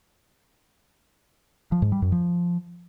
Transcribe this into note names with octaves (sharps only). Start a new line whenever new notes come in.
F3
G#2
G3
F#2
F3